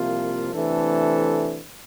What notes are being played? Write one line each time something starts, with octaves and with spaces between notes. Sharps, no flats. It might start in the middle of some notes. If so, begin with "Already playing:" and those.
Already playing: C2 C3 F3 A#3 F4
C3 E3 A3 D4 A4